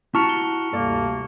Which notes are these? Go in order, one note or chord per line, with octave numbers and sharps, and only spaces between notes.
E4 F#4 G4 A5 A#5 C#6 F6 C#7
G7
D2 G2 C3 A#3 A4 D5